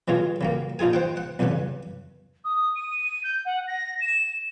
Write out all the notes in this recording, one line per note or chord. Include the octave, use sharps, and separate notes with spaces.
B2 F#3 F4 G#4
C#3 F#3 A#3
A#1 D#4 F4 G#4 G#5
C5 F#5 G5
F#5
B1 E2 G2 C#3 F#5
D#6
D#7
G6
F#5
A#6
E7